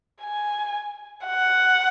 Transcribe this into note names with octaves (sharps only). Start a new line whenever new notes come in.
G#5
F#5